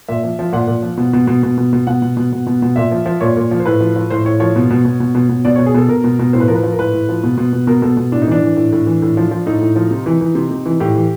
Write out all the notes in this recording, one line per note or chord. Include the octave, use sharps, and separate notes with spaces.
A#2 E5
F3
F3
A#2 F#5
A#2
F3
B2
B2
B2
B2
B2
B2
B2 F#5
B2
B2
B2
B2
B2
A#2 E5
F3
F3
A#2 C#5
A#2
F3
C5
A2 B4
F3
F3
A2 C5
A2 C#5
F3 C#5
B2
B2
B2
B2
B2
B2
B2 D5
B2 C#5
G#4
B2 A4
B2 A#4
B2
B2
A2 C5
B4
F3 A#4
B4
F3
A#4
A2 B4
A2
F3
B2
B2
B2
B2 A#4
B2 A4
B2
A2 D4
D#4
E3 D4
E3
A2
A2
E3
A2
F3
F3
A2 D#4
A2
F3
C3
E3
E3
C3
C3
E3
A2 G4
E3